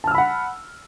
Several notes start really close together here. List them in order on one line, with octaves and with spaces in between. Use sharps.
A5 F6 E6 B5 F#5